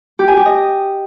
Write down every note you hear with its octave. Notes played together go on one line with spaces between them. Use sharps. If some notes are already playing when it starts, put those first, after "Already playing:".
G4
G#5
G4
D#5